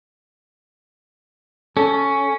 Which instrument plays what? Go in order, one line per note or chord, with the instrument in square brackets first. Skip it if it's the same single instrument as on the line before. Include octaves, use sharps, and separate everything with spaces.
[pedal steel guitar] C#4 [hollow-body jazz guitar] A4